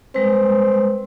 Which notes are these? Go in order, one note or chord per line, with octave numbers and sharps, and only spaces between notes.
G3 G#3 C4 B4